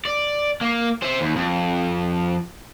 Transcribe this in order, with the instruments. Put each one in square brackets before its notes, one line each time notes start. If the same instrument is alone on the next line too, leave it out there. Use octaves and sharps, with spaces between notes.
[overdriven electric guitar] D5
A#3
C5 E5
D#2
F2